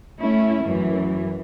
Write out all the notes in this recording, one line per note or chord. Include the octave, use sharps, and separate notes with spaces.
A3 C#4 E4
F#2 E3